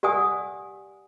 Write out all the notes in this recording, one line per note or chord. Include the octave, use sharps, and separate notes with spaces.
G4 D5 F#5 G#5 D#6